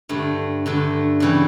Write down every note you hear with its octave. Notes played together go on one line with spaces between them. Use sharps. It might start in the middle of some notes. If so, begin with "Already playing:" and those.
G2 D3 A3
G2 D3 A3
C#3 E3 G3 B3